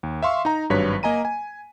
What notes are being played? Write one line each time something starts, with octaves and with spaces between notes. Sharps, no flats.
D#2
E5 F5 C6 C#6 E6
D#4 A#5
G#1 G2 F#3 B4 C#5 B6
A#3 D#5 G#5 A#5 D#7
G#5